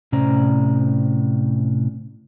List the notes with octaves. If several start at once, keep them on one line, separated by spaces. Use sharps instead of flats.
A2 C3 C#4 C5 D5 A#5